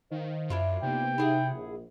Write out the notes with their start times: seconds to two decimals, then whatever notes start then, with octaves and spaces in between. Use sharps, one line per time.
0.11 D#3 C5 D#5 F5
0.50 F#2 D4 E4 F4
0.83 C3 A#3 B3 D#4 G5
1.18 D#4 E4 G#4 F#5
1.52 A#1